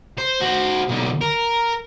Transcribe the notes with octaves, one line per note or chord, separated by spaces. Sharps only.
C5
F#4 C5
B1 D3
A#4